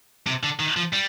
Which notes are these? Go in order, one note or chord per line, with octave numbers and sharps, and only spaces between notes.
C3
D3
D#3
F3
G3